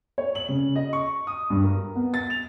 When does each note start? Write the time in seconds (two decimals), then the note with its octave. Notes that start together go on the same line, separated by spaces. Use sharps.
0.18 C#5
0.35 F#7
0.49 C#3
0.76 D#5
0.93 C#6
1.27 D#6
1.50 G2
1.64 A#4
1.96 B3
2.14 A6
2.30 F7